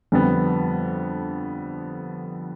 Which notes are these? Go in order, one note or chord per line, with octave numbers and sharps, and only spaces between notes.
F2 D3 G3 B3